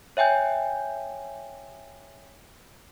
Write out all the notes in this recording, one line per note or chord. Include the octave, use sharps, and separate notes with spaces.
C#5 E5 G5 G#5 G6